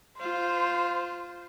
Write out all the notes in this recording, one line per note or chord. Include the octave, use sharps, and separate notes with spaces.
F4 C5